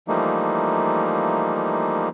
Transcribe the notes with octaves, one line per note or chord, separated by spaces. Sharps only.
E3 F3 G3 A3 A#3 D#4